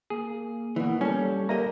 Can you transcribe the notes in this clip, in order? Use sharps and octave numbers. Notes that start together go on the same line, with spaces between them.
A#3 G#4
B2 E3 A#3
G3 C#4 A4
A#3 G4 D#5 E5 A#5